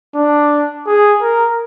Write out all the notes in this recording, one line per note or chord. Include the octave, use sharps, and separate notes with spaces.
D4
G#4
A#4